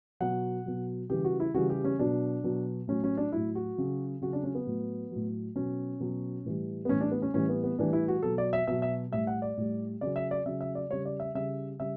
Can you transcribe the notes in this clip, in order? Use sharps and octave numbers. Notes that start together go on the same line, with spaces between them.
B2 F#3 F#5
B2 F#3
C#3 E3 G3 G4
F#4
E4
C#3 E3 G3 F#4
G4
C#4
B2 F#3 D4
B2 F#3
A2 F#3 C#4
C#4
D4
A2 F#3 E4
F#4
C#3 F#3
C#3 F#3 F#4
D4
C#4
B3
A2 F#3
A2 F#3
B2 F#3 C#4
B2 F#3
A2 E3 G3
B3
A2 E3 G3 C#4
D4
B3
C#4
A2 E3 G3 C#4
B3
B3
A2 E3 G3 D4
E4
F#4
B2 F#3 A4
D5
E5
B2 F#3 E5
E5
A2 G3 E5
F#5
D5
A2 G3
C#3 F#3 D5
E5
D5
C#3 F#3 E5
E5
D5
C#3 G3 C#5
D5
E5
C#3 G3 E5
C#3 G3 E5